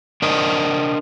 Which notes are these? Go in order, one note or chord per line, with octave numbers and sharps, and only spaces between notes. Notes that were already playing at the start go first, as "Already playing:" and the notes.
D4 A#4 C5 D#5